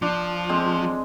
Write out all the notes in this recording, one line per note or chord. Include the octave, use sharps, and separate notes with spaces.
F3 D4
G#3 C4